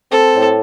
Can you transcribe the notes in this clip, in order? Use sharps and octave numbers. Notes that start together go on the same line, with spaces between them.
C4 A4
A2